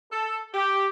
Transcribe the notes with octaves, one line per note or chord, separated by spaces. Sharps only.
A4
G4